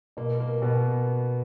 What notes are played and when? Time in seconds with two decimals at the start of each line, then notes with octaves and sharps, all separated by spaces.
0.17 B2 A#3
0.40 A#3
0.62 B2 B3